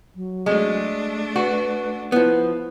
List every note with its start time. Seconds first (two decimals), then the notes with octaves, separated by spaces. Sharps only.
0.15 F#3
0.46 G#3 A3 D4
1.36 F#4 B4
2.12 F3 B3 E4